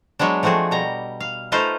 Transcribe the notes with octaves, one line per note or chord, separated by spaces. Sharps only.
F#3 G#3 B3 D4
F3 A3 C4 F#4 G#4
B2 G3 A#5
F5
A3 D#4 F4 B4 C5 F5